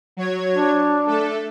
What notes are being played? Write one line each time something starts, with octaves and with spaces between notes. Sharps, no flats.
F#3 C#5 G#6
D4
A3 A4